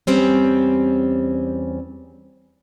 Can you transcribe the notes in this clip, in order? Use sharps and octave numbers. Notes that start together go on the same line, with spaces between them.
E2 G3 C4 C#4